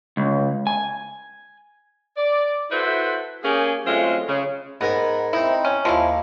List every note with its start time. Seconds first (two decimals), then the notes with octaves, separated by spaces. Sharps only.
0.17 C#2
0.67 G#5
2.17 D5
2.72 E4 F#4 A4 B4 C5
3.44 A#3 C#4 G4 G#4
3.86 F#3 G#3 A3 C4 C#4 F4
4.28 C#3
4.81 G#2 B3 A#4 G#5
5.33 C4 D#4 E4
5.65 C#4
5.85 D#2 F3 G#3 E4 F5